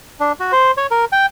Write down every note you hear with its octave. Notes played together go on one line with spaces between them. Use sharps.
D4
F#4
C5
C#5
A#4
G5